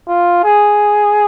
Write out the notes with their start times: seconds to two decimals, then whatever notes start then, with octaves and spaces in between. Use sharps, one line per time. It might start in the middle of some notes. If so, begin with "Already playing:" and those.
0.08 F4
0.44 G#4